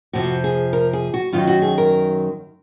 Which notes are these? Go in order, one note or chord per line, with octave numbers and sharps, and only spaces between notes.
F2 C3 F3 F#4
G#4
A#4
G#4
F#4
F#2 D#3 F#3 F4
F#4
G#4
A#4